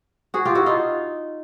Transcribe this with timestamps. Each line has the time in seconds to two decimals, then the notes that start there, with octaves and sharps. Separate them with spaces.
0.34 F#4 G#4
0.45 F4 G4
0.55 E4 F#4
0.66 D#4 F4